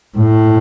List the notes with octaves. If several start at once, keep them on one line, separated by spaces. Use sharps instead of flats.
A2